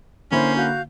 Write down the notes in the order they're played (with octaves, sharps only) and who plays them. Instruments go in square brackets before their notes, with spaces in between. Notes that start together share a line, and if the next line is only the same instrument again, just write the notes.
[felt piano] D3 A#3 E4 [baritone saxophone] C#4 [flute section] C5
[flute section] F#4 F5 G6